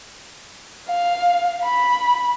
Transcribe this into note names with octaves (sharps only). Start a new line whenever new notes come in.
F5
B5